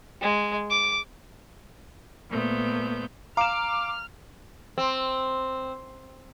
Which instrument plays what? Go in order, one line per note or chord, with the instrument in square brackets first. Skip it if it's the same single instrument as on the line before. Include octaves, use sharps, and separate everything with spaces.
[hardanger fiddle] G#3
D6
[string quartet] A#2 A3 B3 C5 G6
[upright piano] F5 E7 [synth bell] A#5 [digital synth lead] D6 [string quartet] F6
[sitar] C4